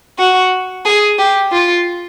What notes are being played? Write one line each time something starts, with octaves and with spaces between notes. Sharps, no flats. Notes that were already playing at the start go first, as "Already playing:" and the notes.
F#4
G#4
G4
F4